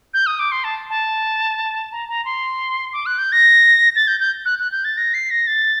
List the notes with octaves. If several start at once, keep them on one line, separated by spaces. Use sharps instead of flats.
G6
D#6
D6
C6
A5
A5
A#5
A#5
C6
D6
F#6
G6
A#6
A6
G6
G6
F#6
F#6
G6
A6
A#6
C7
A#6
A6